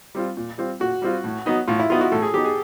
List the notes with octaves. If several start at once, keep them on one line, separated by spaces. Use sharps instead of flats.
G3 C4 F4
A#2
G3 C4 F4
A#2 F#4
G3 C4 F4
A2
F#3 B3 D#4
A2 F4
E4
F#3 B3 D#4 F4
F#4
A2 A4
G#4
F#3 B3 D#4 G4
G#4